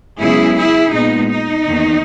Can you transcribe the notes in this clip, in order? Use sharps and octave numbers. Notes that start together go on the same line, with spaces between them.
F#2 C#3 G#3 B3 E4 G#4
E4 G#4
A#2 G#3 B3 D#4
D#4
E2 D#3 A#3